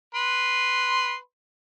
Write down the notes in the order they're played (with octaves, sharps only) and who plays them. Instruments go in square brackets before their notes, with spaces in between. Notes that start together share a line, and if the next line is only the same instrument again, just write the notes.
[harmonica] B4 C6